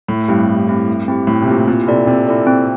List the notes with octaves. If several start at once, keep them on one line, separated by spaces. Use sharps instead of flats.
A2 A3
G2 C4 E4 G4
A3
C4 E4 G4
A3
C4 E4 G4
A2 A3
C3
A#2 C4 E4 G4
A#2 C4
C3 E4 A4 D5
C3 C4
E4 A4 D5
C4